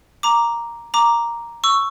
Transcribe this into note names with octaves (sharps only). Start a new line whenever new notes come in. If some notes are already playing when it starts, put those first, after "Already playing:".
A#5 D6
A#5 D6
C#6 E6